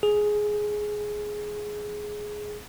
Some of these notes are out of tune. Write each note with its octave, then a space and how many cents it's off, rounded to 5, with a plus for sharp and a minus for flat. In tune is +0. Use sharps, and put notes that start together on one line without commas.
G#4 +10